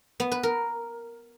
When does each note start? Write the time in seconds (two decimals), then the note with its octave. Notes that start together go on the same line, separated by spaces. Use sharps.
0.20 B3
0.32 B4
0.43 A#4